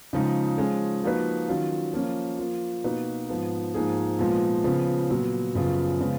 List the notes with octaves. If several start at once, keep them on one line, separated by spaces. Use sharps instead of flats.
C#3 F3 G#3 D#4
F3 G#3 C#4 G#4
F3 A#3 D#4 F#4 B4
D#3 F#3 C#4 F4
F3 A#3 C#4
F3 A#3 F4
B2 A#3 D#4 F#4 B4
G#2 F3 B3
G#2 F3 A#3 D#4 G#4
A#2 F3 G#3 B3
C#3 F3 B3
A#2 F#3 B3
F#2 C#3 F3 B3 F4
C#3 F3 G#3 B3 F4